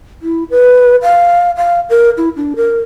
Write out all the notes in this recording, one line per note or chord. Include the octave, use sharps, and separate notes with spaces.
E4
B4
F5
F5
A#4
E4
D4
A#4